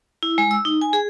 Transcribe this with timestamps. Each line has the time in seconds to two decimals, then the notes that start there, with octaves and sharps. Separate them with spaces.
0.23 E4
0.38 G#3
0.51 E6
0.65 D#4
0.81 G#5
0.93 G#4